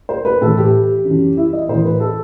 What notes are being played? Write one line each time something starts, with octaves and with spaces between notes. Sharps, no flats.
C5
B4
A2 E3 A4
G4
F#2 E3
E4
D#5
A2 E3 C5
B4
A4